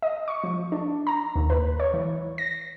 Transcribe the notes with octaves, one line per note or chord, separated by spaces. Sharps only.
D#5
C#6
F3
D4
A#5
D#2
B4
C#5
E3
A#6